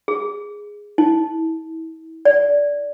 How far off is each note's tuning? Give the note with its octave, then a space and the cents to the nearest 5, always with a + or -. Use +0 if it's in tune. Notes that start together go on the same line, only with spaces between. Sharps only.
G#4 -5
E4 -35
D5 -15